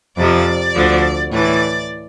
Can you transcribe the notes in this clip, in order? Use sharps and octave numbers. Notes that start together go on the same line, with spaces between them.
F2 C3 F3 D5
D2 D3 F3
A2 E3 D5